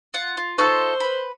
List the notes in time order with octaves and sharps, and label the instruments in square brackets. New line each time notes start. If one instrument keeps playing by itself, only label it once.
[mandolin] F4 F#5
F4
[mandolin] D#4 F4 A4 [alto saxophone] C5 [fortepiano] C#6 E6
[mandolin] B4 B5